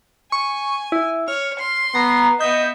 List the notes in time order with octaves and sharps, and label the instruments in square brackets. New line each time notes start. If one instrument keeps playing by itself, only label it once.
[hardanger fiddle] G#5 [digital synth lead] C#6
[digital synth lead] E4
[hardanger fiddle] C#5 [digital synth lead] F6
[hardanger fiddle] C6
[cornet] B3 [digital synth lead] A#5
[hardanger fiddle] B3 E5 [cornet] D#5 [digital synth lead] G6